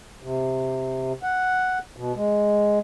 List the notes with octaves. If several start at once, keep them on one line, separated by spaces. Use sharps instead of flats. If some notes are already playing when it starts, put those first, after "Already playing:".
C3
F#5
B2
G#3